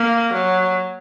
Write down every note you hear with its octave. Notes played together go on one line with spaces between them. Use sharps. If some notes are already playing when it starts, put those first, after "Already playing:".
Already playing: A#3
F#3